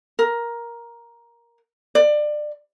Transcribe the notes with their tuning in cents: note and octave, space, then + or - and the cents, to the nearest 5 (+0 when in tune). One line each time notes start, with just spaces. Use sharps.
A#4 +10
D5 +25